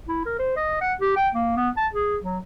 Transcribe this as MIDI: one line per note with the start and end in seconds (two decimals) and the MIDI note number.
0.08 0.25 64
0.26 0.36 70
0.39 0.56 72
0.57 0.78 75
0.81 0.93 78
1.01 1.15 67
1.16 1.29 79
1.35 1.56 58
1.57 1.70 59
1.77 1.87 81
1.93 2.17 68
2.22 2.39 54